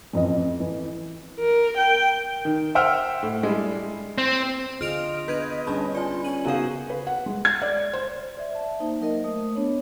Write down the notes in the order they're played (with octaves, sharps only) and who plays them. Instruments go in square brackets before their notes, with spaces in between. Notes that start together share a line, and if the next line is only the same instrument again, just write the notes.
[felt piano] A1 F2 E3 D#5
E3
[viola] A#4
G5
[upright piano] D#3
C5 E5 F#5 G5 E6 F6
A2
G3 G#3 D4 E4
[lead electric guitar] C4
[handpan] D3 F4 G#4 [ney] D#5 [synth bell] F6 D7 F7
[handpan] B3 D4 G#4 [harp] B4 [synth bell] G6 G#6 D#7
[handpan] G3 C#4 G#4 [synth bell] D4 A5 B5
[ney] F4 [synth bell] D5 G#5
[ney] C#4 [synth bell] D#7 F#7
[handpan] C#3 D#4 A#4 [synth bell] B3 F5 [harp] F#4 G#4 C5
[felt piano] B4
F#5
G#3
G#6
D5
C5
[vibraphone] D5 E5
E5 A5
A#3 D#4 C5
F#3 D#4 A#4 D#5
A3 D#6
B3 D4 C#5